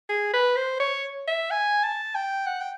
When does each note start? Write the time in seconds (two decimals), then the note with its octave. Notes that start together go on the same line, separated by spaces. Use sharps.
0.09 G#4
0.34 B4
0.56 C5
0.80 C#5
1.28 E5
1.51 G#5
1.84 A5
2.15 G5
2.47 F#5
2.61 G5